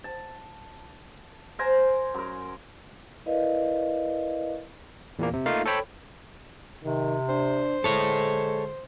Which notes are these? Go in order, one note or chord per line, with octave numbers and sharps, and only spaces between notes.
A5
A#4 C5 G#5 A#5
F#2 A#4
E4 A#4 B4 D5 D#5 F5
E2 A#2 A#3
C3
A3 A#3 D#4 F4 F5
A4 C5 C#5 G5 B5
C3 D#3
D4 C5
D3 G#3 A4 C#5